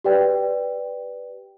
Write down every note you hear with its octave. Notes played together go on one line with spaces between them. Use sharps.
G4 B4 D5 G5